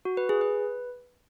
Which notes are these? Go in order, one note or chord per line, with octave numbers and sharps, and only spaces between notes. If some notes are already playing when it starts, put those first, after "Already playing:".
F#4
B4
G#4
B4